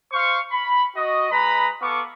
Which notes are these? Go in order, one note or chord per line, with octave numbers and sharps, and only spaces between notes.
C5 F5 C#6
B5
F#4 D#5
G#3 B4 A#5 B5
B3 A4 F5 C#6 D6